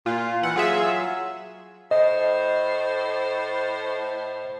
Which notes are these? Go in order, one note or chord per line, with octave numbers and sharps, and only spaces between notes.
A#2 F4
E3 F#5
F#3 F4 G#4 E5
A2 C5 D#5